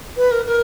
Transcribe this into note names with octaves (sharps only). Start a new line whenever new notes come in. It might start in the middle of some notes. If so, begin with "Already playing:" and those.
B4
A#4
A#4